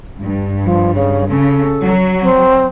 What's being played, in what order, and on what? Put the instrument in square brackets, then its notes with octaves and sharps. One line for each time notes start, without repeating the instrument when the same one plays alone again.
[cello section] G2
[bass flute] F3
C#3
[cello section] C#3 [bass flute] A4
[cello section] F#3
[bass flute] C4